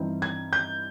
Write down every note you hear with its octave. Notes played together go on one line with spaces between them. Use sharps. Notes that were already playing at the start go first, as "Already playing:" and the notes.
Already playing: G2 E3 G3 C4 D#4
G#6
G6